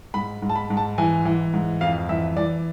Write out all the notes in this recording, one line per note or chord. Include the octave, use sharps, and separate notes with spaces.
G#2 B5
G#2
A5
B5
G#2
A5
E3 G#5
E3
G#2
F2 F5
E3 E5
E3 D5